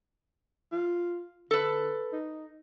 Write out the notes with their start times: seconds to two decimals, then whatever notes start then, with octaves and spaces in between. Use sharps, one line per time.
0.72 F4
1.51 D3 A4 B4
2.12 D#4